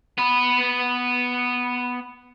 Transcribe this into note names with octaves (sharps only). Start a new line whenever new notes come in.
B3 B4